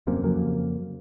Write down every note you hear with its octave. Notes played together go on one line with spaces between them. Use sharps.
D#1 F#2 C3 A#3
F2 C#3 F#3 A#3